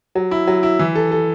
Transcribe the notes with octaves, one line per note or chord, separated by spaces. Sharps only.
F#3
E4
F#3
E4
E3
A4
A4